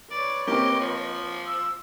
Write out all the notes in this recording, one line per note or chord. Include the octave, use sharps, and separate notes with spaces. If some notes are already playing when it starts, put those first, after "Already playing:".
B4 C#5 D5
A#3 C4 G4 D#5
F3
E6